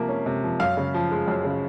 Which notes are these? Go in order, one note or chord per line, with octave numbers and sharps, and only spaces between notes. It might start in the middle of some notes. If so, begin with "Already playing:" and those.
Already playing: C3 F3 A#3
C#4
C3
F3
F#2 F5
C#3
F3
G#3
F#2
C#3